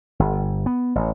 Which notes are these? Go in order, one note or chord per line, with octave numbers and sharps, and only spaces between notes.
G1
B3
A1